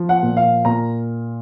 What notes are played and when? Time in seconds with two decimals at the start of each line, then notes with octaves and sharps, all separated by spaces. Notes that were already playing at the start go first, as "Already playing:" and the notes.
Already playing: F3
0.09 F#5
0.23 A#2
0.37 F5
0.65 A#2 A#5